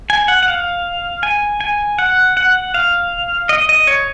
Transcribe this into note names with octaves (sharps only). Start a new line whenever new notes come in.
G#5
F#5
F#5
F5
G#5
G#5
F#5
F#5
F5
D#5
D#5
C#5